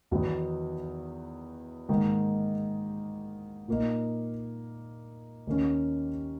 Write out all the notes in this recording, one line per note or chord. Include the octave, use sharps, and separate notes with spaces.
E2 D#3 F#3 B3 D#4
G#2 D#3 A#3 D#4
A#2 A#3 D#4
D#2 D#3 A#3 C#4